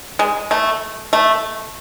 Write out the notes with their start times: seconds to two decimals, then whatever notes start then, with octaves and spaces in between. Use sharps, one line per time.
0.19 G#3
0.51 A3
1.13 A3